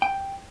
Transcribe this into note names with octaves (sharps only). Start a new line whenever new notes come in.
G5